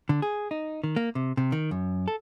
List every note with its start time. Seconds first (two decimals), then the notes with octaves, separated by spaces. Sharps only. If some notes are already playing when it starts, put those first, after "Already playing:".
0.09 D3
0.22 G#4
0.51 D#4
0.84 D#3
0.96 A#3
1.15 C3
1.37 C3
1.52 D#3
1.71 F#2
2.08 A4